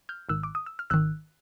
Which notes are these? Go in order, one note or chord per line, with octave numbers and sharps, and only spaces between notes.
F6 G6
G#1 G#2 D#3 E6 F#6
D6
D#6
E6
F6
G#1 G#2 D#3 E6 F#6